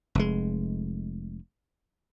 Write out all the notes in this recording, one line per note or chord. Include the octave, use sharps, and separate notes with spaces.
F1 G#3